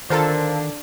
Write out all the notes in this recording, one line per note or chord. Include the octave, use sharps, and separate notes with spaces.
D3 D#3 F4 A4 A#4 C5 A5